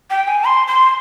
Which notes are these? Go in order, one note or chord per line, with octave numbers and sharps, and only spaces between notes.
G5
G#5
C6
C6